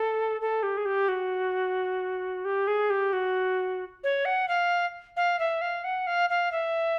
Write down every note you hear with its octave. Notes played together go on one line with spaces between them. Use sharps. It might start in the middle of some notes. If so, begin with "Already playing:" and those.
Already playing: A4
A4
G4
G#4
G4
F#4
G4
G#4
G4
F#4
C#5
F#5
F5
F5
E5
F5
F#5
F5
F5
E5